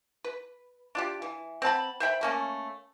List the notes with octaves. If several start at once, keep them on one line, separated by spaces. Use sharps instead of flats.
B4
D4 F4 G4
E3
C4 F#5 A5 B5
C5 E5 G5 B5
A3 A#3 C#4